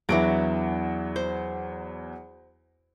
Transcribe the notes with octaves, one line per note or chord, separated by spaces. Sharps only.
E2 E3 F#3 D4 F#4 D7
C5